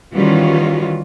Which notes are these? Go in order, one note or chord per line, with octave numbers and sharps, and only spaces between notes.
D#3 E3 G3 C#4 F4 F#4